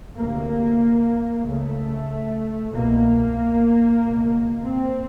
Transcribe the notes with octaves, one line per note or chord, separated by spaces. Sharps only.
D2 C3 A#3
C#2 C#3 A3
C2 B2 A#3
C#2 B2
C4